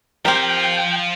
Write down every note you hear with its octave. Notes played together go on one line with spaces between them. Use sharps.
F3 C4 G4 A#4 F5 G5